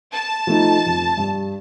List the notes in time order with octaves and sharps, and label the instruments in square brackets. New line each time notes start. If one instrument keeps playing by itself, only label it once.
[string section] A5
[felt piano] F3 A3 D#4
F2
G2